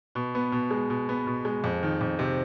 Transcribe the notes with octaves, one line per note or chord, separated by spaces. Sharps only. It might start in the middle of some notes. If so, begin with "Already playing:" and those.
B2
B3
B2
G#3
B2
B3
B2
G#3
F2
D#3
F2
C3